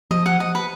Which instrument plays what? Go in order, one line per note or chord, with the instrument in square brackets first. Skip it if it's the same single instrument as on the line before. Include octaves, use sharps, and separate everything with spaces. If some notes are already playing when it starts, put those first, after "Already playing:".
[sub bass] F3 [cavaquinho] D#5
[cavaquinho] F#5
D#5
B4